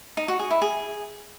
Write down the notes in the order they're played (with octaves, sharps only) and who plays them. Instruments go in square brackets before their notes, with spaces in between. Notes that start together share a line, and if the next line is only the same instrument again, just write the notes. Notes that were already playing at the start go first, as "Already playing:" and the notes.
[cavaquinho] D#4
F#4
G#4
E4
G#4